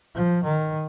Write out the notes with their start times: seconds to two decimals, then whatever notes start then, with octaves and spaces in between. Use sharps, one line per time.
0.15 F3
0.44 D#3